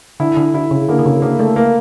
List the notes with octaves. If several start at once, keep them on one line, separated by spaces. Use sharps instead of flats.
D3 E4
D3
D3 E4
C#3
D3 A#3
D3
C#3
D3 A#3
A3
A#3